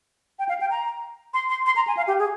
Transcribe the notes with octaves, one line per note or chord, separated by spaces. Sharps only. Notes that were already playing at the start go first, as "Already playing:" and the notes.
G5
F5
G5
A#5
C6
C6
C6
A#5
G#5
F5
G4
G#4